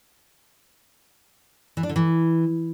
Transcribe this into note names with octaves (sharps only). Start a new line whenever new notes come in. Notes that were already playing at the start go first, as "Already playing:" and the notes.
E3
D4
D3
E3